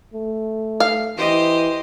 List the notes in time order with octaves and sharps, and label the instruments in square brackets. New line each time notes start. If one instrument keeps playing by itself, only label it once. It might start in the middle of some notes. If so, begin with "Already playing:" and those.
[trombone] A3
[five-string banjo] F5
[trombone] E3 [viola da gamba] G4 C5 D#5